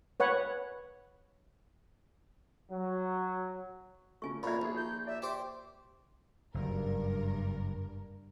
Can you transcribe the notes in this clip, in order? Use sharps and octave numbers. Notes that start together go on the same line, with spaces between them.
B4 C#5 F#5
F#3
C#3 A3 F4 G#5 C#6
F2 A#2 E5 A#5 B5 C#6 G#6
A#1 D#4 G#4 A4 E5
A#5 G6
D5 E5
G4 C5 D6
F#1 G2 A#4